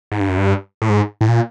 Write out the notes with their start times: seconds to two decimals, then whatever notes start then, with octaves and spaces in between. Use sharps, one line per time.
0.12 G#2
0.20 G2
0.29 F#2
0.38 G2
0.82 A2
0.89 G#2
1.21 A2
1.29 A#2